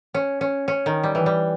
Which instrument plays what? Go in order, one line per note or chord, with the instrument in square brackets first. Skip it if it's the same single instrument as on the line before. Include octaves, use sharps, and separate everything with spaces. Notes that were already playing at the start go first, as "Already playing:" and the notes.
[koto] C#4
C#4
C#4
D#3
G3
E3
G3